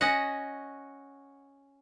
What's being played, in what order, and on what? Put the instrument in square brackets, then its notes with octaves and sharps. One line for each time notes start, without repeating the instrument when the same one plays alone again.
[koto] C#4 F#4 D#5 F#5